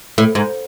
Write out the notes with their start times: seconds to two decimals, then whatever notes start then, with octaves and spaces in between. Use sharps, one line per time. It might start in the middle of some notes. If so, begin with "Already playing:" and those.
0.18 A2
0.35 G#2